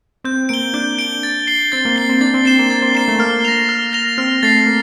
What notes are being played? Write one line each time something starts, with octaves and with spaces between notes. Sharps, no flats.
C4 G6
A#3 D7 G7
D4 G6
D7 G7
A6
C7 G7
C4 A6
A#3
A#3 C7 G7
C4
D4 A6
C4
C4 C7 E7 G7
A#3
A#3 A6
C4
A#3 C7 E7 G7
A3
A#3 F6
A#6 F7
F6
A#6 F7
C4 F6
A3 A6 C7
A#3